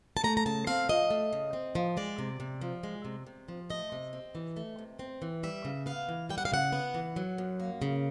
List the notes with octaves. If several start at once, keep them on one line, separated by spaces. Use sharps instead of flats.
A5
A3 A#5
A#5
C#3 A5
C4 F5
F3 D#5
A3
C#3
C4
F3
G#3 D5
C3
C3
F3
G#3
C3
C3
F3
A3 D#5
C3
C4
E3
A3
C3
C4
E3
G3 E5
C#3
B3 F5
E3
G3 G5
F#5
F5
C#3 F#5
B3
E3
F#3
F#2
A#3
C#3